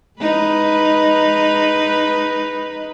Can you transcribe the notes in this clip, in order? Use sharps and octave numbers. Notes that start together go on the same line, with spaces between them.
G#3 D#4 B4